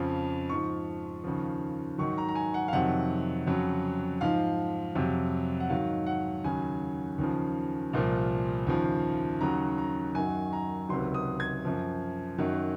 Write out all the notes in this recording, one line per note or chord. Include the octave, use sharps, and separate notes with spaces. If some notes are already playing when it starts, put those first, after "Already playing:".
Already playing: F2 C#3 F3
G#2 F3 C#6
D#2 C#3 F3
G#2 D#3 F#3 C#6
A#5
A#5
G#5
F#5
F5
F2 C3 D#3 F#3 F#5
F2 C#3 F#3
G#2 F3 F5
F2 C3 F#3
F#5
G#2 D#3 F#3 F5
F#5
D#2 C#3 F#3 G#5
D#2 C#3 F3
C2 A#2 F3
D#2 C#3 F3
D#2 C#3 F#3 A#5
A#5
F#2 D#3 F#3 G#5
A#5
C#2 C3 D#3 F#3 C6
D#6
G#6
F#2 F3
F#2 D#3 F#3